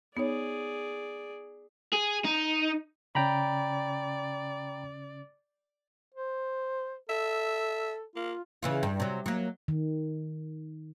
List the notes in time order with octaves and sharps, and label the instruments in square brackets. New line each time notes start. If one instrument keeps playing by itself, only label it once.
[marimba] B3 D#4 C#5 [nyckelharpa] G#4 D5
[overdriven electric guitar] G#4
D#4
[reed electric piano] C#3 C#4 [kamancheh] D5 [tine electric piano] G5 A#5 B5
[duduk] C5
[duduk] A4 [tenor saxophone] E5
[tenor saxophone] A#3 [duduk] F4
[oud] C#3 E3 F4
G2
C3 F#3
F#3 A#3
[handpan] D#3